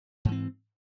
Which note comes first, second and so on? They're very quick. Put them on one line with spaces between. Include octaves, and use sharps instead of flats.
G#2 E3 C4